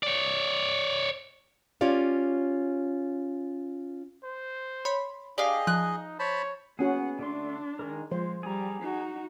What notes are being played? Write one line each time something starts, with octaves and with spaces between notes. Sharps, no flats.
C#5 D5
C#4 F4 G4 C#5 D5 F5
C5
C#5 B5 C6
D4 G4 G#4 D5 D#5 F5
F3 D#4 F#6
C5 C#5 A5 B5
A#3 B3 C#4 F#4 G#4 F#5
D3 A3 D4 C6
D#3 G#3 A#4
F3 G#3 C5 C6
G3 G#4 A#5
D#4 F#4